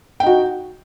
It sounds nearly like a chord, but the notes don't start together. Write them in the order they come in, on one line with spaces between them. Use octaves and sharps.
G5 D#4 F#4